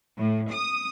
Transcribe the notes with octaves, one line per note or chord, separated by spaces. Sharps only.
A2
D#6